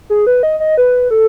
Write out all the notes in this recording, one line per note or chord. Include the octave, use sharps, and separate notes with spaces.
G#4
B4
D#5
D#5
B4
A4